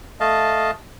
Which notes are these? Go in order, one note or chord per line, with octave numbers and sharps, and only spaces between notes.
A3 D#5 F5 A5